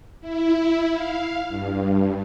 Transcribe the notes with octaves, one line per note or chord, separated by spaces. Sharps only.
E4
F5
G2